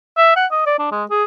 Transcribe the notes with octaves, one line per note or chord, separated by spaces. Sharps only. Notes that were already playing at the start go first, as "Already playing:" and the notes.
E5
F#5
D#5
D5
D4
G#3
G#4